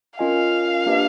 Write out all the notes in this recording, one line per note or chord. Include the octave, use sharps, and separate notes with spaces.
C#4 F4 A#4 D#5 F5 G#5
A#3 D4 G4 B4 D#5